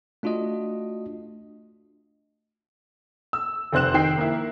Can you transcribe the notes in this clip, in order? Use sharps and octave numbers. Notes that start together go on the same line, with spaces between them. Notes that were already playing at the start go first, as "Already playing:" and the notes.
A3 D4 F4 F#4 D#5
E6
F1 C4 C5 F#6 E7
D#3 G5 C7
A#3 E4